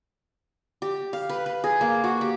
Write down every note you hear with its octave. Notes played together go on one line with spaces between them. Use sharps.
G4
F5
B4
B4
G#4
A#3
F#4
G4